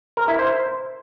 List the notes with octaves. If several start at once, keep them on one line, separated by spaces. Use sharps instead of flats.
A#4
E4
C5